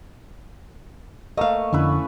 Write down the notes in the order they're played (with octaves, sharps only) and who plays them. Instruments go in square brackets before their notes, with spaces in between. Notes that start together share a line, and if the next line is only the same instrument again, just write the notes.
[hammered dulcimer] A3 A#3 [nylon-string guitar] D#5 F5
[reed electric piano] F2 D3 [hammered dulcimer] C#4 E4 B4